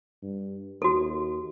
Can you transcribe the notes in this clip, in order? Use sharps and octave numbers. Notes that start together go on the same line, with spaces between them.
G2
D#2 F#4 A4